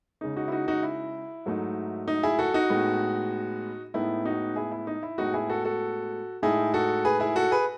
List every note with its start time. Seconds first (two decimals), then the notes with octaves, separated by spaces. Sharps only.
0.21 C#3 G#3 D#4
0.37 D#4 F#4
0.48 E4
0.52 D#4 F#4
0.68 D#4 F#4
0.83 E4
1.46 G#2 F#3 A3 D#4
2.08 D#4
2.23 E4 G#4
2.39 F#4 A4
2.54 D#4 F#4
2.70 A2 G#3 B3
3.94 A2 G#3 B3 D#4 E4
4.25 D#4 F#4
4.56 E4 G#4
4.72 E4
4.87 D#4
5.03 E4
5.18 A2 G#3 B3 D#4 F#4
5.34 E4 G#4
5.49 F#4 A4
5.65 F#4 A4
6.43 A2 G#3 D#4 E4 G#4
6.74 F#4 A4
7.05 G#4 B4
7.20 E4 G#4
7.36 F#4 A4
7.51 G#4 B4